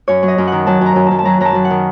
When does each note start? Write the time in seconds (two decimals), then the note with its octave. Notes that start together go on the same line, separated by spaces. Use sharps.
0.08 F#2 C#5
0.23 F#3
0.28 D#5
0.38 F#2
0.47 D#3 F#5
0.66 F#3 A5
0.81 F#2 A#5
0.96 F#2
1.07 F#2 A5
1.19 A5
1.25 F#3 A#5
1.41 F#2 A5 A#5
1.55 F#3
1.65 F#5
1.71 D#3